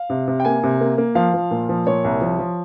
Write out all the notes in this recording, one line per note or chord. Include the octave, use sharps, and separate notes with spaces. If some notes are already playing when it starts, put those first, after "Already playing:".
Already playing: F5
C3
C3
G5
A#3 G#5
C3
A#3
A#3
F3 F5
F3
A#2
F3
A#2 C#5
C2
F3
F3